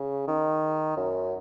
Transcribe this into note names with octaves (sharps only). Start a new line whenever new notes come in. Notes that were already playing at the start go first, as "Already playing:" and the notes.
Already playing: C#3
D#3
F#2